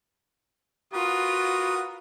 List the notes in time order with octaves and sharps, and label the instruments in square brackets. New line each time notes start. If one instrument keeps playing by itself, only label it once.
[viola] F4 [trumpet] F#4 [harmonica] A#4 B4 D#6